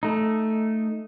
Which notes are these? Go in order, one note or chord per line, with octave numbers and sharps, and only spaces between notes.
A3 D#4